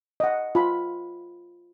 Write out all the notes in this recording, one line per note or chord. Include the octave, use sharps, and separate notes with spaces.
D#5 F#5
F4 B5